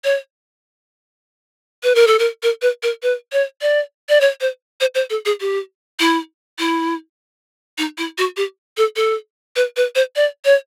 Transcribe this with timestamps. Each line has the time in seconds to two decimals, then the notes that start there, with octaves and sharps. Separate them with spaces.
0.04 C#5
1.83 B4
1.95 A#4
2.07 A4
2.19 A#4
2.43 A#4
2.62 B4
2.83 A#4
3.03 B4
3.32 C#5
3.62 D5
4.09 D5
4.21 C#5
4.41 C5
4.81 C5
4.95 C5
5.10 A4
5.25 G#4
5.41 G4
6.00 E4
6.59 E4
7.78 D#4
7.98 E4
8.18 F#4
8.37 G4
8.77 A4
8.96 A4
9.56 B4
9.77 B4
9.95 C5
10.16 D5
10.45 C#5